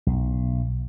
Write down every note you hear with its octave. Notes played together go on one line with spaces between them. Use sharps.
B1